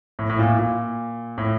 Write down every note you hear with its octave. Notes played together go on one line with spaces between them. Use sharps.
A2
A2
A#2
A#2
A2